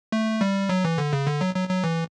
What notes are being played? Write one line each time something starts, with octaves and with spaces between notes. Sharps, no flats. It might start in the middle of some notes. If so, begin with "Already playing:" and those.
A3
G3
F#3
E3
D3
C#3
D3
F#3
F#3
F#3
E3